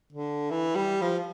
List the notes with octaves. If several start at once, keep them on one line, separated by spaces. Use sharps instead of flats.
D3
E3
G3
F3